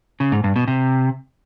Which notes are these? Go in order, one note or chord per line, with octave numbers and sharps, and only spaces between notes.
C#3
G#2
G2
B2
C3